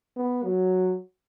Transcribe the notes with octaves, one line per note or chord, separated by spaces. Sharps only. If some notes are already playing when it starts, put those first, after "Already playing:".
B3
F#3